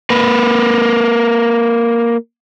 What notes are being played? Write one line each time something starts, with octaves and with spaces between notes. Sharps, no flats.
A#3 B4